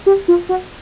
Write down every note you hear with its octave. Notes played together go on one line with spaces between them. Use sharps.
G4
F4
F#4